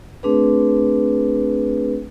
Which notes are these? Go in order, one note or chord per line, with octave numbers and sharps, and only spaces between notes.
A3 C4 D4 G#4 B4